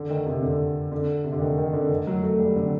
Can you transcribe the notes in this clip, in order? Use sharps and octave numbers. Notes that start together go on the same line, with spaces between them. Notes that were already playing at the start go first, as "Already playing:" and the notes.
Already playing: D3
D#3
C3
D3
D3
C3
D3
D#3
D#3
D3
D#3
F#3
A3
G3
D3